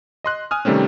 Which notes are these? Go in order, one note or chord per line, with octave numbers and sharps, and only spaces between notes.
D#5 C6 F#6
G#5 D#6 F6
C3 D#3 G3 A3 C4 C#4